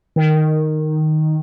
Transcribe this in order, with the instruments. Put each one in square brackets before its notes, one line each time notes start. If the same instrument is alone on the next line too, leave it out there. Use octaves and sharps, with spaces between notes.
[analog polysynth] D#3